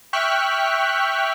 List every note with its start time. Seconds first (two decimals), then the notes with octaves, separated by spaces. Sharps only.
0.13 E5 G5 C#6 F6 F#6 B6